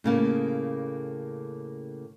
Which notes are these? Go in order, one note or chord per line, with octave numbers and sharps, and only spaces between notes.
A2 C#3 A#3